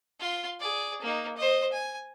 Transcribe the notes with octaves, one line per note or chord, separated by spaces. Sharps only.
F4 C6
G#4 D5
A#3 D#4
C5 D#5
G#5